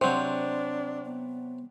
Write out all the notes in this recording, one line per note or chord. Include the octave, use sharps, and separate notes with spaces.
C3 F#3 C4 D4 C5
B3